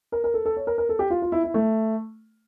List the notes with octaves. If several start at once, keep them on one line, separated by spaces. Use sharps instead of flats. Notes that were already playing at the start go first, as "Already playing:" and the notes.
A#4
A#4
A4
A4
C#5
A#4
A#4
A4
G4
F4
F4
E4
E4
A3